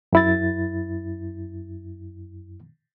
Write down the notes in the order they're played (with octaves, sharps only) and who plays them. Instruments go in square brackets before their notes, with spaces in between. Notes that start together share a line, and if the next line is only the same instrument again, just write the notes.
[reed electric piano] F#2 E4 A6